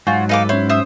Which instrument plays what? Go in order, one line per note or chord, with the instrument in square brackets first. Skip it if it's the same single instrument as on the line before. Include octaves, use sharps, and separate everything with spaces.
[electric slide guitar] G#2 F#3 [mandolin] F4 F#4 G6 [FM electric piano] G#5
[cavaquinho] D#4 F5 D6 [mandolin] A4 B4
[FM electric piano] C#4 C#5 [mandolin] E4 [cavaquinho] C5
[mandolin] C5 D#6 E6 [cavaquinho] E5